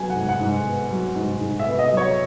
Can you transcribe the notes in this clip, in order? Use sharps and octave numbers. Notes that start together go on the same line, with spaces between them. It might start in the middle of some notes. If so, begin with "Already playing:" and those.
Already playing: F#3 B3 G#5
F#5
G#2
F#5
G#2
B3
F#3
G#2
G#2
E5
B3
D#5
F#3
C#5